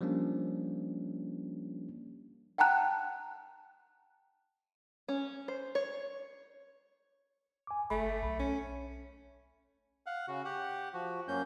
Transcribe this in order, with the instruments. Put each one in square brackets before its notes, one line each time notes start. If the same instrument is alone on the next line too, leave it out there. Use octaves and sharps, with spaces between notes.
[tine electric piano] F3 G3 A#3 C#4 D4
[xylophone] F#5 G5 A5 A#5 F#6
[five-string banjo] C#4
C5
C#5
[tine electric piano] G#5 D6
[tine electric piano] G1 B5 [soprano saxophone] A3
[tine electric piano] B1
[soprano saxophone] C#4
[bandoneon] F5 F#5
C#3 F#4
G4 F#5
F3 F#4
F#2 A#3 C#4 G6